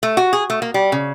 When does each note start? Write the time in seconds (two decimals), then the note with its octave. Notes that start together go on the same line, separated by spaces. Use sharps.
0.03 A3
0.17 F#4
0.33 G#4
0.50 A3
0.62 A#3
0.74 G3
0.92 C#3